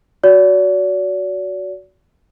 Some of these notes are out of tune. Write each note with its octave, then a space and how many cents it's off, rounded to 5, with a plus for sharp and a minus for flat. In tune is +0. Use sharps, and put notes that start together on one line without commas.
F#4 +0 D5 -40